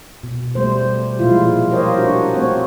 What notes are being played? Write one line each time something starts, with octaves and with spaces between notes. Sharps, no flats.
B2
G3 A3 C5
A#2 F3 G3 G#3 E4 F4
G4 A#4 C5 C#5 D#5 F5
D4 F#4
A3 C4 C#5